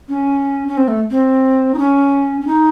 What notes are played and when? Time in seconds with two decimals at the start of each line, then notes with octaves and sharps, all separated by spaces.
0.09 C#4
0.68 C#4
0.77 C4
0.88 A3
1.11 C4
1.74 D#4
1.79 C#4
2.41 C#4
2.47 D#4